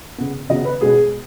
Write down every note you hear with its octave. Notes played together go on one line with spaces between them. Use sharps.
C#3 B3
C#3 F#3 B3 D#5
B4
B2 G#3 C#4 G#4